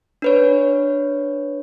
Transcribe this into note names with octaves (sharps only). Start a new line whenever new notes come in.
D4 B4 C#5